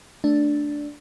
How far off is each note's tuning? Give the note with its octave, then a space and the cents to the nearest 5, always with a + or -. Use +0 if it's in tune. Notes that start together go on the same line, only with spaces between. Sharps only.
A3 +0 D4 +0